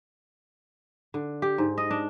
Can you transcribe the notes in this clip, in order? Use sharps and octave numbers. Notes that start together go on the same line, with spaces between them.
D3
G4
G#2
D#5
D4